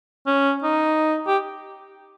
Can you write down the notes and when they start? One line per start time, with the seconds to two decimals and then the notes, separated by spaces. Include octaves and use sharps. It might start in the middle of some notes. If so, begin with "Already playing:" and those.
0.26 C#4
0.63 D#4
1.27 G4